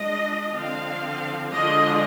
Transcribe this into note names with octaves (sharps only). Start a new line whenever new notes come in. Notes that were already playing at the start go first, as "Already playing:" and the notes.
Already playing: G#3 D4 F4 D#5
D3 F3 C4 F5
D3 F3 G#3 D4 F4 D#5